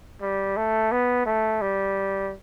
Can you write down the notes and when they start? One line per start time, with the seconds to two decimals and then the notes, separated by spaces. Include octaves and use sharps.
0.21 G3
0.57 A3
0.92 B3
1.25 A3
1.61 G3